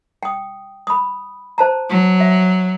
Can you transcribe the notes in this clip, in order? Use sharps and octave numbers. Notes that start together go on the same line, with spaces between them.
G5 D#6
B5 D#6
C5 A5 A#5
F#3
E5